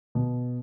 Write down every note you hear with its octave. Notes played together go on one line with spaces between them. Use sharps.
B2